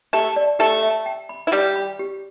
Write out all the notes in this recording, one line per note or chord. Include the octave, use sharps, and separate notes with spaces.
A3 G4 A4
D5
A3 G4 A4
E5
G5
B5
E4
G3 G4 D5
B5
G4